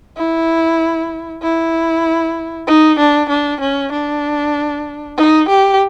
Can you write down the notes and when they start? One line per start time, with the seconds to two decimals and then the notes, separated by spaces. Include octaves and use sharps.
0.17 E4
1.42 E4
2.67 D#4
2.99 D4
3.29 D4
3.60 C#4
3.92 D4
5.17 D#4
5.48 G4